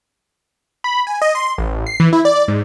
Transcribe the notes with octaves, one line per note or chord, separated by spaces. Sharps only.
B5
G#5
D#5
C6
A1
C7
E3
E4
D5
G#2